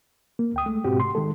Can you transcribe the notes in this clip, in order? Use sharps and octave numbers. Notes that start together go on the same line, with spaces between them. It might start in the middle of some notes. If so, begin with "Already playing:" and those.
A#3
D2 G5 D#6
G#3 A3
G#2 B2 C4 F#4 G4
C3 C6
D#3 G#3 A4